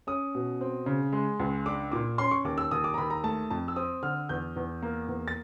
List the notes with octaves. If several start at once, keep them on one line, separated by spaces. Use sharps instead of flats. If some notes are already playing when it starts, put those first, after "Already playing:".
C#4 D#6
B2
C4
C#3
G#3
C#2
D4 D6
A#2 D6
C#4 C6
C#6
D#2 D6
E6
D#2 D#6
D6
A#5
D#2 B5
A#5
A3 A5
F2 A5
E6
C4 D#6
D3 F6
E2 G6
E2
A#3
E2
A6